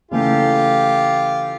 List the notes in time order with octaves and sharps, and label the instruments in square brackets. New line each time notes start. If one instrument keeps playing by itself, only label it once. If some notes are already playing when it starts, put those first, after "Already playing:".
[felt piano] C#3 E3 A3 [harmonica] F4 G4